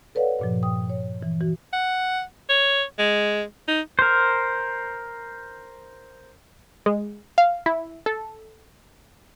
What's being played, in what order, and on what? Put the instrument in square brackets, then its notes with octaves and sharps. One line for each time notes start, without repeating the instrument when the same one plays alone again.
[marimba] A4 B4 C#5 D5 F5 F#5
G2 A#2 F3
G5 D#6
C#5
E3
E3 F#4
[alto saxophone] F#5
C#5
G#3
D#4
[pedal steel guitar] A#4 C5
[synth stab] G#3
F5
E4
A4